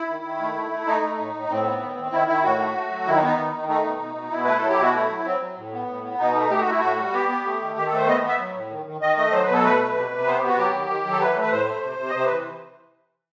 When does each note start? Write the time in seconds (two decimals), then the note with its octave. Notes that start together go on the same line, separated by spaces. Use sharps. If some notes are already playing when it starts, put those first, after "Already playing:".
Already playing: E4
0.09 D#3
0.24 D#3
0.40 A3
0.56 A3
0.71 A3
0.87 A3 D#4
1.02 A3
1.19 A2
1.34 A2
1.49 A2 C4
1.65 B3
1.80 D#3
1.97 D#3
2.12 D#3 E4
2.27 D#3 E4
2.44 A2 F#4
2.59 A3
2.75 A3
2.90 F#3
3.07 D#3 E4
3.16 D#4
3.21 B3
3.27 D#4
3.37 D#3
3.53 D#3
3.68 A3 D#4
3.85 B2
4.00 B2
4.16 B2
4.31 B2 E4
4.45 A3 B4
4.56 A4
4.62 F#3
4.69 G4
4.79 B2 F#4
4.94 A3 E4
5.09 F#3
5.25 F#3 C4
5.40 F#3
5.56 A2
5.73 B3
5.88 A2
6.04 B3
6.19 B2 D#4
6.35 A3
6.51 A3 G4
6.61 F#4
6.67 A3 E4
6.80 A2 F#4
6.98 G3
7.13 B3 G4
7.29 B3
7.45 A3
7.61 D#3
7.76 D#3 G4
7.86 A4
7.92 A3 C5
8.07 B3 D#5
8.23 B3
8.29 E5
8.39 F#3
8.54 A2
8.71 D#3
8.86 D#3
9.01 D#3 D#5
9.17 A3 D#5
9.32 F#3 C5
9.43 B4
9.48 B2
9.54 A4
9.64 A3 B4
9.80 B2
9.95 C3
10.11 C3
10.26 B3 C5
10.38 B3 G4
10.48 F#4
10.57 F#3 G4
10.73 D#3
10.89 D#3
11.05 F#3
11.12 A4
11.21 E3 B4
11.36 A3
11.42 B4
11.51 A2 C5
11.67 A3
11.83 C3
11.98 C3
12.10 D#5
12.14 C3 C5
12.26 E3 B4